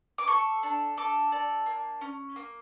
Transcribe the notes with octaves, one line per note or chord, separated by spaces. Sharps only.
D6
A4 C#6
D4
A4 D6
D4
A#3
C#4
A#3